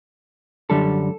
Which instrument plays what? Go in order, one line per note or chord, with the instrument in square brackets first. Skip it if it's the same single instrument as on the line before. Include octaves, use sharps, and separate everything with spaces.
[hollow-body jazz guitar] F#2 D3 G3 A4